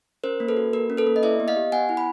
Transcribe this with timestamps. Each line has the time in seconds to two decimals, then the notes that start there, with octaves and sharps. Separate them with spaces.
0.24 C#4 A#4 C5
0.40 A#3
0.48 A4 B4
0.57 F#4
0.73 A#3 A#4
0.90 C#4
0.97 A4 B4
1.07 A#3
1.16 D#5
1.23 E4 D5 E5
1.40 B3
1.48 D#5 F5
1.56 G4
1.72 B3 F#5 G#5
1.89 E4
1.97 B5